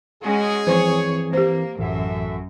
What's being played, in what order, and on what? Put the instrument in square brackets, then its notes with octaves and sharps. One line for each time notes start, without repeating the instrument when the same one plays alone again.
[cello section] G#3 C#4 F#4 [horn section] G#4
[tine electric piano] E3 C4 [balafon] F3 C5 [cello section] C#5
[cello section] A#3 [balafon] G4 C5
[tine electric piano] A1 [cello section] F#2 [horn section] F#4 A4 E5